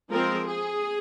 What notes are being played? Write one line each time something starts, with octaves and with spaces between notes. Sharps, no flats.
F3 G#3 C4 A#4
G#4